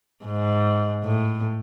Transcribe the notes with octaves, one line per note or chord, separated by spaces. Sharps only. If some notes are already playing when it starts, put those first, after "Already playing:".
G#2
A2